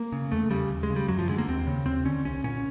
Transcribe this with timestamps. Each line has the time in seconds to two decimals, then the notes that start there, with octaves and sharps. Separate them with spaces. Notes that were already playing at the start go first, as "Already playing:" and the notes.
Already playing: A#3
0.12 C#3
0.32 E2 A3
0.51 C#3 G3
0.70 D#2
0.83 G#3
0.90 C#3
0.96 G3
1.08 F#2 F#3
1.19 F3
1.28 D3 G#3
1.38 A#3
1.48 D#2 C4
1.67 C#3
1.86 D#2 C4
2.05 D3 C#4
2.25 C2 C#4
2.44 A#2 C#4